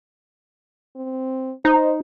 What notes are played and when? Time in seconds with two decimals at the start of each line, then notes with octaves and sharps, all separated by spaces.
0.96 C4
1.65 D#4 C5